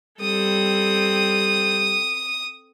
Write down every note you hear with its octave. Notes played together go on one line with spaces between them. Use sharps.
G3 C4 A4 D#6